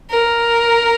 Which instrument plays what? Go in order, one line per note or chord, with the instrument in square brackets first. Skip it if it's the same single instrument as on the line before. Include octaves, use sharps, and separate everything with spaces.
[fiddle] A#4